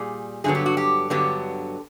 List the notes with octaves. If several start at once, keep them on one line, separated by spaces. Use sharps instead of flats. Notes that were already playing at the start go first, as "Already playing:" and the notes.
Already playing: A#2 G3 G#4
G2 D3 F#3 B3 G#4
G4
F#4
G4
G2 D3 F#3 B3 G4